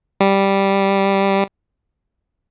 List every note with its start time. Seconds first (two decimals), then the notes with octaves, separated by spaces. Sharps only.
0.20 G3